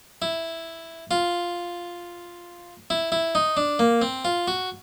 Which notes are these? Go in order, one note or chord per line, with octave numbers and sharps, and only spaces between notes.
E4
F4
E4
E4
D#4
D4
A#3
C4
F4
F#4